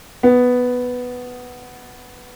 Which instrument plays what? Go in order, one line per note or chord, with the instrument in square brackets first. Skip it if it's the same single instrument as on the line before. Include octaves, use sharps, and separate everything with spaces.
[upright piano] B3